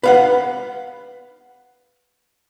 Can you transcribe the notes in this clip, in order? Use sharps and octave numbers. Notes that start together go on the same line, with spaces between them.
B4 F5 F#5